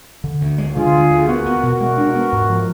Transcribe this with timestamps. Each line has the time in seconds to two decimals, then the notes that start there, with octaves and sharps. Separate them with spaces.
0.24 D3
0.41 D2
0.58 G#3
0.75 D3 F4 G#4
0.93 D2
1.10 D2
1.28 B3 F#4 A#4
1.46 B3
1.63 B2
1.80 G#3
1.97 D4
2.15 B3
2.32 G#2
2.49 F3